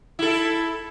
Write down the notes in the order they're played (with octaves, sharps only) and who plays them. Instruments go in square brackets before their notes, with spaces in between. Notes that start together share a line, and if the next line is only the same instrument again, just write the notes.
[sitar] E4 A4